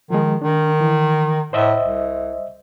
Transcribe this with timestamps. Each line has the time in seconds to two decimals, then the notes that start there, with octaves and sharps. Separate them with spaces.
0.10 D#3 F3 G#3
0.42 D#3 D4
0.81 E3
1.53 A2 C5 D#5 E5
1.81 C2